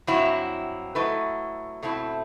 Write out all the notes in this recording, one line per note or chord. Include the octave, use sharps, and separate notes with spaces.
G2 F#3 C4 E4
F#3 A3 E4 B4 D#5
B2 A3 C4 E4